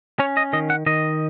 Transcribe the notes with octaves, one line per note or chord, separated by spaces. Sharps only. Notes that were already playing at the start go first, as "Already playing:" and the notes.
C#4 C#5
D#5
D#3 D#5
F#5
D#3 D#5